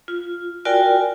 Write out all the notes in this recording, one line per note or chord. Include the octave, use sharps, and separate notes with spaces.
F4
F4 F#4 A#4 D5 G5 G#5